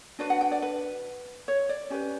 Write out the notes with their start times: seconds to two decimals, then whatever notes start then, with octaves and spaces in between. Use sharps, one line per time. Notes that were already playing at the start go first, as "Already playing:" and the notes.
0.19 D4 F#4 B4 D5
0.30 F#5
0.41 G5
0.52 D5
0.62 B4
1.48 C#5
1.69 D5
1.90 C#4 G4 B4